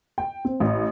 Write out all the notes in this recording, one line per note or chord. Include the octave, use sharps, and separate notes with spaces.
G5
C4
A1